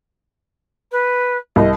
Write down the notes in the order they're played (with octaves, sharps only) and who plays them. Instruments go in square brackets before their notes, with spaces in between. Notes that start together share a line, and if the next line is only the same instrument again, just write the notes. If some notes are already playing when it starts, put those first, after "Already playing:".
[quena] B4
[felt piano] C2 [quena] D#5